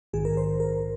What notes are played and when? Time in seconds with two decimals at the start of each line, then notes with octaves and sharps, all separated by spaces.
0.13 A#1 G#2 D#3 G#4
0.25 A#4
0.37 C5
0.60 A#4